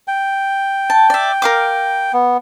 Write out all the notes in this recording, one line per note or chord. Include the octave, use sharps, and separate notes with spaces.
G5
A5
D5 E5
A#4 F5 D6
B3